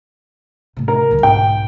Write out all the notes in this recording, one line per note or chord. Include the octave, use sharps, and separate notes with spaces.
A2 C3
A#4
D2 G2
B1 G#2 G5